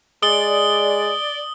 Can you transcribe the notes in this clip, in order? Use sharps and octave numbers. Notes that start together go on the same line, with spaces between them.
G#3 D5 D#6 G7